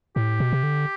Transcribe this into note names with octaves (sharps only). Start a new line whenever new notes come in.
A2 G4
B2
C3
D3